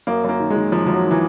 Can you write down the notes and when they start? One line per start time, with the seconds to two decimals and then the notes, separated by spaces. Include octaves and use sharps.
0.07 F#2 A#3
0.24 F#2 A#3
0.40 D#3
0.50 G#3
0.56 D#3
0.72 F#2 F3
0.86 F#2 F3
0.94 F#3
1.05 D#3
1.11 E3